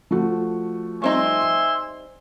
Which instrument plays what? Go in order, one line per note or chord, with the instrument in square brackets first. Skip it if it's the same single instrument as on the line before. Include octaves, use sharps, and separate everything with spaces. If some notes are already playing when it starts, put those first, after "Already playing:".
[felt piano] F3 A3 F#4
[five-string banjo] G3 C4 D#4 [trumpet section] E5 G#5 C6